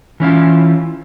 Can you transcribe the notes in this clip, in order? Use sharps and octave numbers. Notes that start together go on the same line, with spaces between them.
E3 C#4 E4 F4